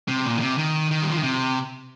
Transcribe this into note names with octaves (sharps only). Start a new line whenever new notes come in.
C3
A#2
D#3
C3
D#3
D#3
G3
F3
D#3
C3